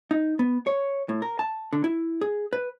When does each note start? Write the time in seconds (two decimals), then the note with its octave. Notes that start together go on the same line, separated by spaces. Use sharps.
0.11 D#4
0.39 B3
0.67 C#5
1.09 A2
1.22 A#4
1.39 A5
1.73 D3
1.84 E4
2.21 G#4
2.53 B4